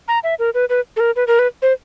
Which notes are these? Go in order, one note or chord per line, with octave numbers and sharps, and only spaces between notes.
A#5
E5
A#4
B4
B4
A4
A#4
B4
A#4
B4
C5